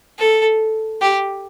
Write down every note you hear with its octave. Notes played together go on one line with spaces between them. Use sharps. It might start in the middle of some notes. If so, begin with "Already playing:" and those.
A4
G4